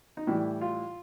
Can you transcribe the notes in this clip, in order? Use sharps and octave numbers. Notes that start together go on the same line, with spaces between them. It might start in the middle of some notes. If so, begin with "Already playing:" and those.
D#4
A2 E3 G3 E4
F4